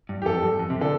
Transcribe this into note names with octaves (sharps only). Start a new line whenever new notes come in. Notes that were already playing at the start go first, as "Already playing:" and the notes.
G2
G4
F2 A4
G2
F2
C3
D3 A4